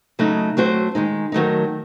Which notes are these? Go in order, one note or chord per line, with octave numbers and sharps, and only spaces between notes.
C#3 F#3 A3 D#4
F#3 A3 C4 F#4 C5
D#3 G#3 D#4
D#3 F#3 A3 D#4